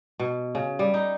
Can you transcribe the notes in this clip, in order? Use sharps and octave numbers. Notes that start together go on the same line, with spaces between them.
B2
C#3
G3
D#4